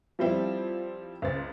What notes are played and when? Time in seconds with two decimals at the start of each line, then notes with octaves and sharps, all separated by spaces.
0.19 F3 G3 C4 E4
1.22 C#2 C5 A6